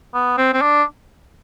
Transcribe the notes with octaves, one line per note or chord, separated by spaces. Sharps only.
B3
C4
C4
D4